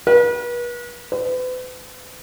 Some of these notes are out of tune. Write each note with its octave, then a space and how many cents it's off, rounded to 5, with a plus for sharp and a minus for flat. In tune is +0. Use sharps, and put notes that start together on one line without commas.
B4 -40
B4 +40